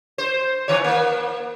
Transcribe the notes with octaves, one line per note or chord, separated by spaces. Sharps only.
C5
D#3 C#5
A#3